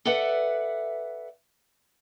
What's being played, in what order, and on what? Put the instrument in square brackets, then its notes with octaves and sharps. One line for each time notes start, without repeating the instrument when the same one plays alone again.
[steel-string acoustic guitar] A4 B4 D5 E5 F#5